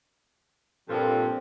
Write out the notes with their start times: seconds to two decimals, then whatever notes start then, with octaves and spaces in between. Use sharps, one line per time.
0.89 G2 A#2 F3 C4 A4